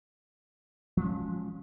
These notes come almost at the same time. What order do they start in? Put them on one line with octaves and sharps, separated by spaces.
F3 G#3 C#4